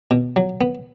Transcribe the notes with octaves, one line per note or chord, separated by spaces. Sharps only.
B2
F#3
B3